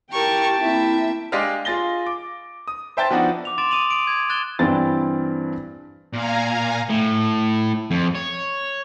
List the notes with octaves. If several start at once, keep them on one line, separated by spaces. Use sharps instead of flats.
E4 G4 A#4 G5 A5 C#6
A#3 C4 E4 E5
G#3 D4 G4 D5 D#5 F5
F4 G#4 A6 A#6 G7
D6
D#6
C5 E5 G5 A5 G6 A6
F3 B3 D4 D#4 F#4
D6 F7
C6 D6 A6 D7 E7
D#6 D#7 F7 F#7
D#6 D7
G#6
F#6 A6 E7 G7
G2 E3 C4 A6
A#2 F5 G#5 A#5
A2
F2
C#5